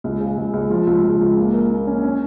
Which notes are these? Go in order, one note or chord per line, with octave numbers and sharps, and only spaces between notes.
C#2
C#3
C#2
C#2
F3
C#2
C#2
C#2
A#3
A#4
A#3
C#4
C#4